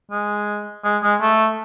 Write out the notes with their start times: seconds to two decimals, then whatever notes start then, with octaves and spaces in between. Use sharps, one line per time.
0.11 G#3
0.84 G#3
1.03 G#3
1.21 A3